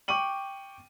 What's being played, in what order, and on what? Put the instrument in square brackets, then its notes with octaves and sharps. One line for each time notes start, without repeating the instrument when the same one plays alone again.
[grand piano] G5 C#6 D6 D#7 F#7